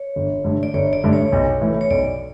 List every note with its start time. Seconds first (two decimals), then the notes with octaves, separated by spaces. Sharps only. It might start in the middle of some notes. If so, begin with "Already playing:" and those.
Already playing: C#5
0.16 G1
0.44 G2 D3 A3
0.63 D5
0.74 G1 C#5
0.93 D5
1.04 G2 D3 A3
1.13 C#5
1.32 B1
1.61 A2 E3
1.81 C#5
1.90 B1 D5